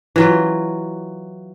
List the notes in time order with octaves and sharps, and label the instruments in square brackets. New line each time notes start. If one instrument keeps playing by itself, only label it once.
[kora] E3 F#3 F4